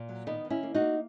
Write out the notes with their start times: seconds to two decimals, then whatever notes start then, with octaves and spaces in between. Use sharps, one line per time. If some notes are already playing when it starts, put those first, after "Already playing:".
Already playing: A#2
0.09 F#3
0.27 D#3 B3 D#4
0.45 D#3
0.50 C#4 E4
0.63 A#3
0.74 D#4 F#4
0.81 A#3